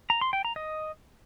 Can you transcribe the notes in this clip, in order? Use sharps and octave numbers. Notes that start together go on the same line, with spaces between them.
A#5
C6
G5
A#5
D#5